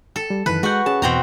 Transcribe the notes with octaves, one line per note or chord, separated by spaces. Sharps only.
A4
G3
F#2 D#3 E3 B4
G#3 F#4 F#5 G6
C#4 G#4 A5
E2 B2 C4 A#5